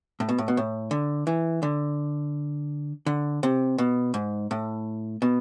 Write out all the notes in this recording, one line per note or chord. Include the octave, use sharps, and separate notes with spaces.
A2
B2
A2
B2
A2
D3
E3
D3
D3
C3
B2
G#2
A2
B2